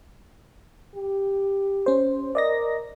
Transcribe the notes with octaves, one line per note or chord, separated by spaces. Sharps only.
G4
C#4 C5
A#4 D5 D#5 A#6